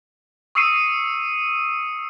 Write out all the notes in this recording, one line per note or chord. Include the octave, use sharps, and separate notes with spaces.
C#6 D#6 E6 C7 C#7 D#7